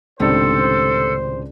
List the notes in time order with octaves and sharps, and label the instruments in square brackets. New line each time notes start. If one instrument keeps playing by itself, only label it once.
[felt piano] C#2 D4 D5 [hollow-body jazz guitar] A2 C3 D#3 [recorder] A4 [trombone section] C5